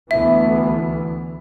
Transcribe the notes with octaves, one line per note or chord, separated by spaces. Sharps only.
D2 E3 B3 E5